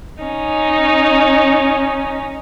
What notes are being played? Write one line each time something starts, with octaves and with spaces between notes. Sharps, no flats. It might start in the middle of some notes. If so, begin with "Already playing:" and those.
C#4 D#4